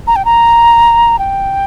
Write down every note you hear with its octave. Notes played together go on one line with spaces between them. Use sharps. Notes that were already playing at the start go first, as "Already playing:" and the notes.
A#5
G5
A#5
G5